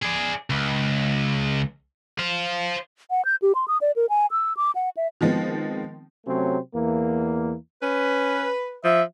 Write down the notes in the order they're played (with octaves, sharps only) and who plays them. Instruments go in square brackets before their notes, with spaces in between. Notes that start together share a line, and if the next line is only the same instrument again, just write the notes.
[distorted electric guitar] G#4 D5
C#2
C5 F5
[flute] F#5
G6
G4
C6
D#6
D5
A#4
G#5
E6
D6
F#5
E5
[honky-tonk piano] D#3 F3 G#3 B3 C4
[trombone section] C3 F#3 A3 C4 C#4
E2 E3 A#3
[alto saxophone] C#4 [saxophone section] B4
[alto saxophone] F3 [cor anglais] E5